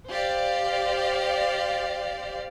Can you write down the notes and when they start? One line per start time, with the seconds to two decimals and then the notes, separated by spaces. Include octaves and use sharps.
0.11 G4 C5 D5 F5